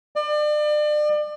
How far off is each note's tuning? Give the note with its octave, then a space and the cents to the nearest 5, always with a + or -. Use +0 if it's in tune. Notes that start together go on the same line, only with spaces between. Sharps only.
D5 +35